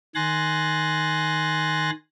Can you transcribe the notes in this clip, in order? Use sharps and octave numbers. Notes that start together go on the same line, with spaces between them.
D#3 G#5 C6 F#6 A6 A#6